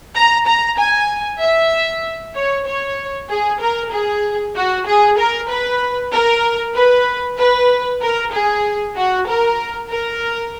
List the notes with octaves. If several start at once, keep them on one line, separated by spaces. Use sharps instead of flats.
A#5
A#5
G#5
E5
C#5
C#5
G#4
A#4
G#4
F#4
G#4
A#4
B4
A#4
B4
B4
A#4
G#4
F#4
A#4
A#4